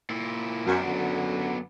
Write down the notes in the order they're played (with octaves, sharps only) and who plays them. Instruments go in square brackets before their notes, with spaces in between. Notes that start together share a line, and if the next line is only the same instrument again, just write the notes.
[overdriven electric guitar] A#2 E4
[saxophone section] F#2 [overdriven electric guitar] B3 D4
[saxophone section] F#2 D3 F#3